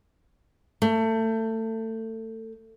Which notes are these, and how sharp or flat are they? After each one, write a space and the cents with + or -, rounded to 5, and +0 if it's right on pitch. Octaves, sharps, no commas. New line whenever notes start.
A3 +25